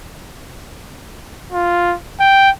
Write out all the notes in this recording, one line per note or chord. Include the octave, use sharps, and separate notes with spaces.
F4
G5